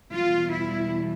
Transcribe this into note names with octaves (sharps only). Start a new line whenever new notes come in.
E2 B2 G3 F4
E4